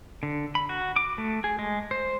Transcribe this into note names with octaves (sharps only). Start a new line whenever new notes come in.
D3
B5
F#4
D6
A3
G#4
G#3
C5